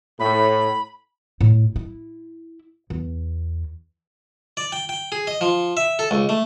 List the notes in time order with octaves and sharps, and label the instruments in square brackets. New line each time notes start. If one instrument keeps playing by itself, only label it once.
[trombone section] A2 [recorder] B5
[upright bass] A2
E4
E2
[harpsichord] D5
G5
G5
G#4
D#5
F3
E5
A4
C#2
A3